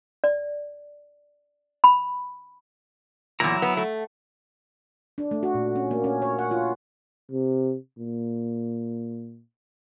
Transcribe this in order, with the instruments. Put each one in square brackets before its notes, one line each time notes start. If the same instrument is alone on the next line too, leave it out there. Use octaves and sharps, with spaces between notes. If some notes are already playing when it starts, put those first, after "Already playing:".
[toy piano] D5
B5
[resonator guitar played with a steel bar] E2 A#2 [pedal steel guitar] F#3 E4 A#5
[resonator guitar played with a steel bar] B3
A3
[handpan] D4
A3
F#4
A#2
C#4
A#3
C#4
C#5
F#5
F4
[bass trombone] C3
A#2